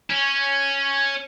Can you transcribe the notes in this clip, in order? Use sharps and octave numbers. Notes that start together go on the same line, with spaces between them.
C#4